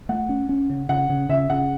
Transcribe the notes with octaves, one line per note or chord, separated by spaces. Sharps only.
A3 F#5
C#4
C#4
C#3
C#3 F#5
C#3
C#3 E5
C#3 F#5